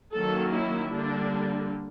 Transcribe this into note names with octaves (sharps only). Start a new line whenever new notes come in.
D#3 F#3 A#3 C#4 A4
E4
D3 G3 A#3 D4